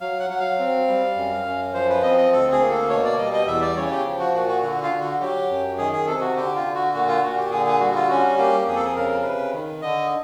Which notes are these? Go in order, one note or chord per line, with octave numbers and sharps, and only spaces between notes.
F#3 F5
F#5
F#3 F#5
F5
C4
G3
F#2
F#2
F3 C5
B4
C4 D#5
D#5
D2 A4
G#4
A#3
A4
B2 C#5
D5
G3 D#5
D#5
E2 E5
D5
C#3 C#5
G4
F3
F#4
A#2 F#4
F#4
D3 F#4
F4
D3
F#4
F#3 G4
F#2
D#3 G#4
G#4
C3 A4
F#4
D3 G4
F4
D3
F#4
A#2 F#4
F4
A#2 F#4
G4
D3 G#4
G#4
G3 F#4
F4
C#4 F#4
A#3 G4
F2 G#4
A4
G#4
C#3 A#4
A#4
C3 B4
D#3
D3 D#5